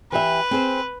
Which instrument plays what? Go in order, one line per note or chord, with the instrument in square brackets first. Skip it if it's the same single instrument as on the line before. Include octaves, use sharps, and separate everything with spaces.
[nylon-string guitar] E3 G4 E5 [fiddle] B4
[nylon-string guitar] C4 G#4 C5